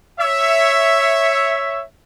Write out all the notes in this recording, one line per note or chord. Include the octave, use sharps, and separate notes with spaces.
C#5 E5